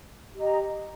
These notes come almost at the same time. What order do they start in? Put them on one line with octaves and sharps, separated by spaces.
G4 D#5 A#5